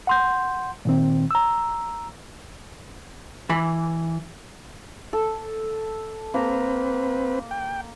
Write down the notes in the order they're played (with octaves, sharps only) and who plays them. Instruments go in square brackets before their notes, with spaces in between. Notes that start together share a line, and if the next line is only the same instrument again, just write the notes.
[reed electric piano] F#5 C6 G6
A#2 D#3 C4
A#5 E6
[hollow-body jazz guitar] E3 B5
[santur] A4
[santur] A#3 A#5 [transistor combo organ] C4 B4
[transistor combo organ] G5